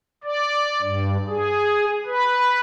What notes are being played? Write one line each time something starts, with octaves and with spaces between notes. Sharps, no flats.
D5
G2
G#4
B4